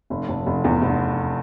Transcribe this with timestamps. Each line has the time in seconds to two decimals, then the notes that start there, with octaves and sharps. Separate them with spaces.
0.10 F1
0.29 F1
0.46 F1
0.64 E2
0.82 F1